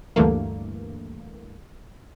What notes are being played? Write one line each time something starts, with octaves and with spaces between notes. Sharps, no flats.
D2 G2 D3 E3 A3 A#3